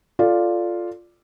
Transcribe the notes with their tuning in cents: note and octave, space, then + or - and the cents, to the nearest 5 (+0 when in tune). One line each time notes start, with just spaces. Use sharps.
F4 +0 A4 +0 D5 +0